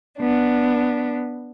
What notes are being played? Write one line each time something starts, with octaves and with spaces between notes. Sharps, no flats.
B3 D4